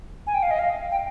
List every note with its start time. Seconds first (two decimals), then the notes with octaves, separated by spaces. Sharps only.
0.27 G#5
0.34 G5
0.43 F5
0.51 D#5
0.59 F5
0.91 G5